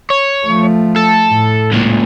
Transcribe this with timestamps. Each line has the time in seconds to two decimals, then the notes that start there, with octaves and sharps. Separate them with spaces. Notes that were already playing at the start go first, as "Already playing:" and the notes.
0.10 C#5
0.46 F3 A3
0.96 A4
1.27 A2
1.72 C#2 A#2